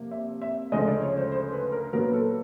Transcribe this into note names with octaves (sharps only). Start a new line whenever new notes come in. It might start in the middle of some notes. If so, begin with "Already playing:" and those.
Already playing: C3 F3 A#3
E5
E5
D2 C#3 F3 G#3 D#5
D5
C#5
C5
C5
B4
A#4
A#2 F#3 B3 A#4
A4